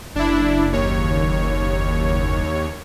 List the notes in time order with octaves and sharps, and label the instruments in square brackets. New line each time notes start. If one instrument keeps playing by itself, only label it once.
[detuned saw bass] F#1 [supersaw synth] D4 E4
[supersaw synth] D#2 C#5